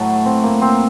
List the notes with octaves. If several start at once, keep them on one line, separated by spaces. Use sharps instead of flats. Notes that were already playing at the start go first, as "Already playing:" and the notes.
Already playing: A2 F#3 A4
C4
A#3
C4